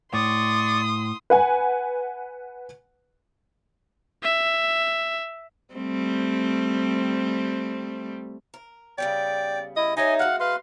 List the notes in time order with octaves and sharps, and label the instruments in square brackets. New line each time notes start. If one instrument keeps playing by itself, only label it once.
[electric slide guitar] A2 [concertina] D5 C#6 [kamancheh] C6 D#6
[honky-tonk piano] B4 F#5 G#5
[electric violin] E5
[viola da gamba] G3 A3 C4
[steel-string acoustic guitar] A#4
[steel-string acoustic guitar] C#3 G3 B3 [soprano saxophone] D5 [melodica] G5
[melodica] E4 [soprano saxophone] D#5
[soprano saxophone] D#4 [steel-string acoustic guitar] G4 C#5 E5 [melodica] D#5 G#5
[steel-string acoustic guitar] G#3 F#4 [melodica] F5 F#5
[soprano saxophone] B4 [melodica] F5 C6